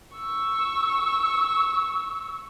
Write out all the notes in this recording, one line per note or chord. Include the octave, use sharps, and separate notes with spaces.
C#6 E6